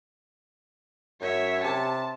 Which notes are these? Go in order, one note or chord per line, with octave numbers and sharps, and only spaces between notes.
F#2 C#5 E5
C3 A5